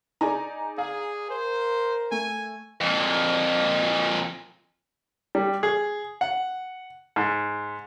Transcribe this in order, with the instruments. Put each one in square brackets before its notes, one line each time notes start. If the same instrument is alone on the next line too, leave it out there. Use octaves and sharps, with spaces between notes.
[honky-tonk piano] D#4 G#4 [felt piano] D5 G#5 A#5
[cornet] G#4 [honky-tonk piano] F5
[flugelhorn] A#4 [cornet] C5
[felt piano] A3 [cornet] G#5
[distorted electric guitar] F2 A#2
[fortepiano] G3
G#4
F#5
G#2